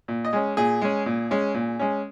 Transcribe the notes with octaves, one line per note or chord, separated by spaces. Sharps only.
A#2
D#5
G#3 C#4
A#2 G#4
G#3 C#4
A#2
G#3 C#4
A#2
G#3 C#4